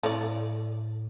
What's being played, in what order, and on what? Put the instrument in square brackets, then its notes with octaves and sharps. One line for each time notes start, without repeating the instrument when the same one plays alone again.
[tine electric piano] A2 [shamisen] A3 C#5 D5